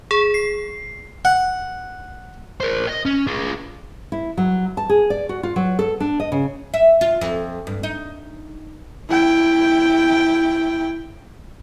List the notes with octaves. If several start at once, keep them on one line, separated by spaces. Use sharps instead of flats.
G#4
C7
F#5
A#4 C5
D#5
C#4
F4 G#4
E4
F#3
A5
G#4
D5
F#4
F4
F#3
A4
D4
D#5
C#3
E5
F4
F2
G2
D#4
E4 G5